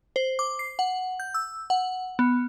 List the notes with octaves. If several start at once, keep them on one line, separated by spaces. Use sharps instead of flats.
C5
D6
C7
F#5
G6
E6
F#5
B3